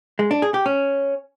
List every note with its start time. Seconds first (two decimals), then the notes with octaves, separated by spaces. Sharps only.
0.19 G#3
0.31 D4
0.42 G#4
0.54 G4
0.66 C#4